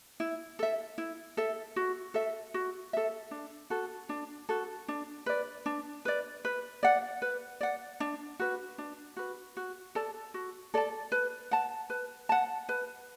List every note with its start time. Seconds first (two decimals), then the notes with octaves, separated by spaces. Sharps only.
0.20 E4
0.59 A4 E5
0.98 E4
1.37 A4 E5
1.76 F#4
2.14 A4 E5
2.54 F#4
2.93 A4 E5
3.31 D4
3.70 F#4 A4
4.09 D4
4.49 F#4 A4
4.88 D4
5.26 B4 D5
5.66 D4
6.05 B4 D5
6.45 B4
6.83 D5 F#5
7.22 B4
7.61 D5 F#5
8.00 D4
8.39 F#4 B4
8.78 D4
9.17 F#4 B4
9.57 F#4
9.95 A4 D5 A5
10.34 F#4
10.74 A4 D5 A5
11.12 B4
11.51 F#5 A5
11.90 B4
12.29 F#5 A5
12.69 B4